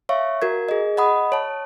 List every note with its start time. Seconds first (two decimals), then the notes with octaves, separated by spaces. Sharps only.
0.09 C#5 E5 F5 C#6
0.42 F#4 A#4 G#6
0.69 G#4 D#5
0.97 D#5 F#5 B5 D#6
1.32 C#5 A5